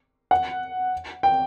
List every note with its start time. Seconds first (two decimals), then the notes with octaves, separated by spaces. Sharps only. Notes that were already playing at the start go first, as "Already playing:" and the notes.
0.31 F#5
1.23 G5